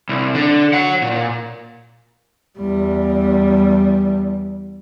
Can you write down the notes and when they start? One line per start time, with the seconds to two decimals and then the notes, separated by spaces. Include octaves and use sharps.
0.09 C2
0.35 D3
0.73 C#5 F#5
1.02 A#2
2.58 E2 G3